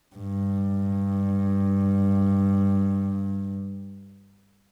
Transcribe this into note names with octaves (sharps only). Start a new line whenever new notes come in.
G2